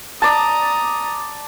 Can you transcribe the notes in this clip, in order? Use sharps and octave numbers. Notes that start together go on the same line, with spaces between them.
D5 A5 A#5 D#6